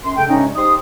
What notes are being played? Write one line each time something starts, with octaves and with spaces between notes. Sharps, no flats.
F#2 C6
C#3 A3 A4 G5
G2 C3 G3 G#3 C#4 D#4
D#4 G4 C5 C6 D#6